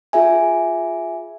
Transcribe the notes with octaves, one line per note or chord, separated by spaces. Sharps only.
F4 G#4 E5 G#5